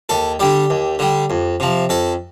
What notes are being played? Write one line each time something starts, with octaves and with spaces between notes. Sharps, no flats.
D#2 A4
D3 G3 G4
D#2
D3 G3
F2
C3 F3
F2 A4